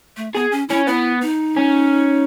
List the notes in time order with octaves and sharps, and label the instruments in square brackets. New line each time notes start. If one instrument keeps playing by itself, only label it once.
[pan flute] A3
[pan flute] B3 [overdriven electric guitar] G#4
[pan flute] C#4
[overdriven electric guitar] C#4 [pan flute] E4
[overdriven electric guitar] B3 [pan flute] E4
[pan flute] D#4
[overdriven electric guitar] C#4